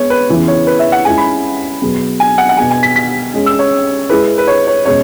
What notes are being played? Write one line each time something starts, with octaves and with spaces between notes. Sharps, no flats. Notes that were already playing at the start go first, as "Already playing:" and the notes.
Already playing: G#3 B3 G#4 C#5
B4
C#3 E3 B3 E4
C#5
B4
E5
F#5
G#3 C#4 E4 G#5
B5
B2 F#3 B3 G#4
G#5
F#5
F#5
B2 B3 G#4 G#5
G#5
B6
B6
G#3 C#4 G#4
E6
C#5
G#3 E4 G#4 B4
B4
C#5
C#5
B2 G#3 C#4 C#5